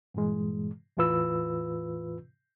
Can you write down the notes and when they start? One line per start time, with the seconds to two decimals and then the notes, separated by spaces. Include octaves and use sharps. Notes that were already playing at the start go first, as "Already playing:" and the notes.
0.14 G2 A#2 E3 G#3
0.97 E2 A2 E3 F4 B4 E6